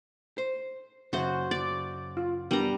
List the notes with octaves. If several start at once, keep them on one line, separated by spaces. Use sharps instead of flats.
C5
F#2 C#3 F#4 C5
D5
F4
G3 B3 D4 A#4 A#5